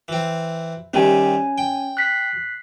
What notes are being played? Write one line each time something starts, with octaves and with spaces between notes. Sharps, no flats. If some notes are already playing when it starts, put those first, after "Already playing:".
E3 C4
C3 D#3 G3 C#4 G#5
G5
F#6 B6 C7